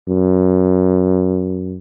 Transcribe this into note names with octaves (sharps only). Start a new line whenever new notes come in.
F#2